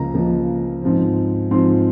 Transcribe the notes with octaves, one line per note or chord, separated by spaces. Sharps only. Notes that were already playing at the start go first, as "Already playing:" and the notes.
Already playing: C#2 C#3 F3 A#3 A#5
C#2 C#3 F3 A#3
G#2 F3 C4
G#2 F3 C4 C6